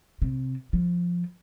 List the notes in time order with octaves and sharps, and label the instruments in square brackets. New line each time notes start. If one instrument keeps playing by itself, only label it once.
[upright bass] C3
F3